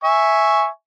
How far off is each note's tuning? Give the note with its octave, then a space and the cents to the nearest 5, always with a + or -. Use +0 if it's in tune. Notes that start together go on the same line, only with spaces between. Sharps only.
E5 +0 G#5 +0 C#6 +0